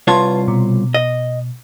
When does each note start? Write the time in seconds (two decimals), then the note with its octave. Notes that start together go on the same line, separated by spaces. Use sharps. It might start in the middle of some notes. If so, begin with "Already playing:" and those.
0.07 C2 F4 B4 C#5 A5 C6
0.48 B2
0.94 D#5